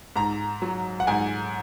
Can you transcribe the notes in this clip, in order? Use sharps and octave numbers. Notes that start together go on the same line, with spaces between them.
G#2 A#5
F#3
F#5
G#2 G#5